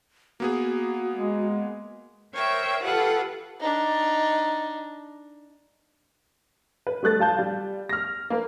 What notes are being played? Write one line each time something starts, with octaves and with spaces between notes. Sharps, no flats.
A#3 B3 F#4 G#4
G#3
A#4 C5 C#5 E5 G5
F4 G4 A4 B4 F#5
D4 D#4
B4
G3 A3 F#6 A6
G3 F4 A5 G6
G3
F6 A#6
A#3 A#4 B4